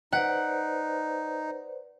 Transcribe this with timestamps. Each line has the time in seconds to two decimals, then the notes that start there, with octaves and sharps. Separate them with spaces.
0.13 D#4 B4 C5 D5 F#5